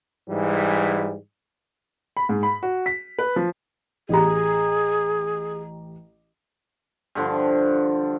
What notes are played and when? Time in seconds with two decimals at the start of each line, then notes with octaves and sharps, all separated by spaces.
0.29 G#2 E3 G3
2.17 B5
2.29 G#2
2.43 B5
2.63 F#4
2.86 B6
3.19 B4
3.36 F3
4.09 A1 G4 G#4 A#5
7.15 G2 D3 F3